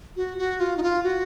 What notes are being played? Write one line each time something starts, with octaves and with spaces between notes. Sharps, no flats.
F#4
F#4
F4
D#4
F4
F#4